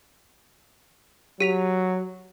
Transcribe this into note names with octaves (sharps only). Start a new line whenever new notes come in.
F#3 G4 B6 F7